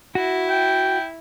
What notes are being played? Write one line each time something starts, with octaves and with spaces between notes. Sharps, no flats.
E4 F#4
G5